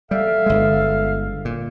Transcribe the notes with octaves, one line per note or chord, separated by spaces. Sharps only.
G3 A4 E5 F5
G1 G#3
A#2